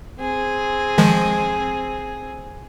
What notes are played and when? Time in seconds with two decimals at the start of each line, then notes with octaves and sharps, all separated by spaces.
0.18 C4 G#4
0.98 D#3 F3 G#3